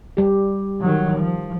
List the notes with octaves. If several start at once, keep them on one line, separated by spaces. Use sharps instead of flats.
G3 G4
D#3 F#3
F3